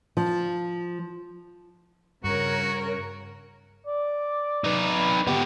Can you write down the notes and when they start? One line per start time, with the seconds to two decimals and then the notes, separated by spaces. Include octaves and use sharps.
0.17 F3
2.24 G2 C#3 F#4 A#4 C#5
3.86 D5
4.64 D#4 B4
5.27 B3 G4